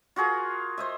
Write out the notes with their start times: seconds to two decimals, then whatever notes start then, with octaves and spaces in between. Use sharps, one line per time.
0.16 F4 F#4 G#4 A#4
0.78 C5 D#5 E5